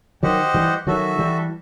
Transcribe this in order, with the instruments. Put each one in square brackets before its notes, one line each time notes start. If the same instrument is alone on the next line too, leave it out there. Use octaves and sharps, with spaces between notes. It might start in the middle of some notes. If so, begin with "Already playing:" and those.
[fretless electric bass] D#3 F#3 [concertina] G4 C5 D#5 F#5
[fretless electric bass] E3 G3
[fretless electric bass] D#3 F#3 [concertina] F#4 A4 E5
[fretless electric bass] E3 G3